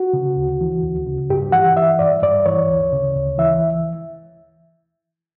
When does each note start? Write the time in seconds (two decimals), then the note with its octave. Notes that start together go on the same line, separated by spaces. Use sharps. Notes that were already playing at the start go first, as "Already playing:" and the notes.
Already playing: F#4
0.13 C#3
0.37 D2
0.61 E3
0.83 D2
1.06 C#3
1.29 G2 G4
1.52 E3 F#5
1.76 E3 E5
1.99 G2 D5
2.22 G2 D5
2.46 E3 C#5
2.68 D2
2.93 C#3
3.16 D2
3.38 E3 E5